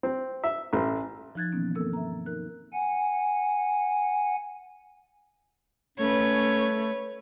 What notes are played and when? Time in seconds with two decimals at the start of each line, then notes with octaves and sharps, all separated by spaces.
0.03 C4
0.44 E5
0.73 A1
1.35 F3 D#4 F#6 G#6 A6
1.52 B2 D#3 E3 A#3 B3 C#4
1.75 G2 A#3 C4 A4 A#4 E6
1.93 E5 A#5
2.26 D#4 A#4 F#6
2.73 F#5 G#5
5.98 A3 C#4 B4 C#5